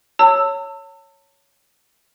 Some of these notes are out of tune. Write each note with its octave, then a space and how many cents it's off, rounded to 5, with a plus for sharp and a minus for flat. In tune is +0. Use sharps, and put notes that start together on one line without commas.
C#5 +0 A5 +40 E6 +0